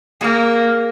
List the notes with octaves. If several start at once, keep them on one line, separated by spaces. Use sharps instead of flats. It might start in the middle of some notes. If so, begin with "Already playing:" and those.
A#3 G#4 A#4